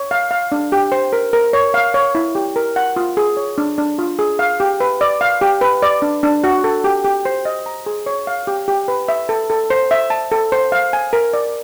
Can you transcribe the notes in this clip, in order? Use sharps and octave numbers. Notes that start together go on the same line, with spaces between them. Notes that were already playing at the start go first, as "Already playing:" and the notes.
Already playing: C#5
F5
F5
D4
G4
C5
A#4
A#4
C#5
F5
C#5
E4
G4
A#4
F#5
F4
G#4
C#5
D4
D4
F4
G#4
F5
G4
B4
D5
F5
G4
B4
D5
D4
D4
F#4
A4
G4
G4
C5
D#5
A#5
G#4
C#5
F5
G4
G4
B4
E5
A4
A4
C5
E5
A5
A4
C5
F5
G#5
A#4
D5